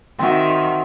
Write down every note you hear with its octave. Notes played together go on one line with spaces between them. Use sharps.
D#3 C4 F#4 E5